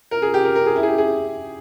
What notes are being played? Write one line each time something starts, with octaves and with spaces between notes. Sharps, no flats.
A#4
G#4
G4
A#4
A#4
G#4
E4
G#4
G4
G#4